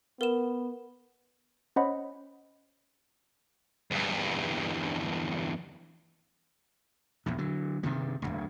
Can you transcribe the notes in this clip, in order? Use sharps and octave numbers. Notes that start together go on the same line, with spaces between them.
B3 A#4 E7
C#4 C5 C#5 D#5 F#5 B5
E2 G2
A#1 E2 A#2
D3 F#3
G2 C3 D#3 G3
D1 G#1 D2